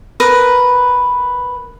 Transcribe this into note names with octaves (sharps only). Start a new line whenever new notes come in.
A#4 B4 D#6